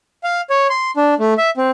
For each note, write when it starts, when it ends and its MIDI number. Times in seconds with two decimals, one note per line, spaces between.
0.24 0.41 77
0.50 0.67 73
0.70 0.91 84
0.97 1.14 62
1.19 1.34 57
1.38 1.50 76
1.57 1.71 60